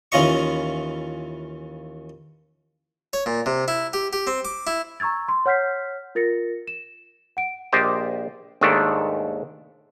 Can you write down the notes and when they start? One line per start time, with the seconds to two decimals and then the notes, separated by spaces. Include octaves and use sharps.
0.12 D#2 E3 C#4 F4 D#5 C#6
3.13 C#5
3.26 A#2
3.46 C3
3.68 E4
3.93 G4
4.13 G4
4.27 C4
4.45 D6
4.67 E4
5.00 A#5 C#6 E6 G#6 A6
5.28 C6
5.46 C#5 F#5 F6 G6 B6 C7
6.15 F4 A#4 A6 A#6 C#7
6.68 E7
7.37 F#5 D7
7.72 A#1 G4 C5 D5 D#5
8.61 D#2 G#2 D#3 A3 D4